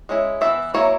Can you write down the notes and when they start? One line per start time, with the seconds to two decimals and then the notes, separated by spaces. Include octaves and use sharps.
0.09 G#3 C#4 E4
0.41 E3 B3 E4 E5
0.74 F#3 A#3 E4 C#5